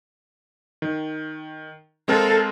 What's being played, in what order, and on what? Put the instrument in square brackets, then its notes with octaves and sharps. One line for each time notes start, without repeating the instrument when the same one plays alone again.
[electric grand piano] D#3
[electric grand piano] G#3 C4 A#4 [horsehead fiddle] A4 F5